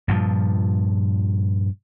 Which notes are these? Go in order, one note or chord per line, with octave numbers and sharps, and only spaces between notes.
G2 A#2 F3